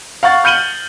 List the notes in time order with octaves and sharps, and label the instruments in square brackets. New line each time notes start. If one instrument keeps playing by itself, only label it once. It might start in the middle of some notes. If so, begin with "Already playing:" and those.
[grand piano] F5 F#5 C#6 A6
F6 G6 C#7 D#7 F#7 G7